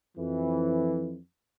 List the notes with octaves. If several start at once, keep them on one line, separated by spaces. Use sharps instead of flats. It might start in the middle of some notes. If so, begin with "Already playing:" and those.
F2 E3